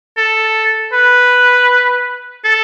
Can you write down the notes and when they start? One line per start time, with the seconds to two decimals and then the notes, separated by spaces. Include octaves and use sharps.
0.17 A4
0.93 B4
2.45 A4